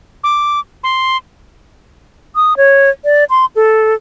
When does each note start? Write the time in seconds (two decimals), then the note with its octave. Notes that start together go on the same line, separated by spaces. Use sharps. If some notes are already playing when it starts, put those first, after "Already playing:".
0.24 D6
0.84 C6
2.36 D#6
2.57 C#5
3.05 D5
3.30 C6
3.56 A4